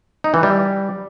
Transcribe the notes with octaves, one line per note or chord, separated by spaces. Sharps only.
D#4
E3
G3